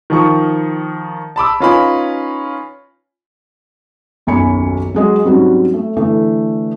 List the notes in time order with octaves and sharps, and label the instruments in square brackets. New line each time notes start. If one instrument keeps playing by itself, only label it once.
[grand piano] D#3 F3 C#6
A5 B5 D6 E6
C#4 D#4 F4 B4 G#5 B5
[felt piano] D#1 B1 F#2 G#5 B5 C#7
F#3 G#3 D#5
G#2 F#3 G3 C4 C#4 F#4
A3
D3 E3 A3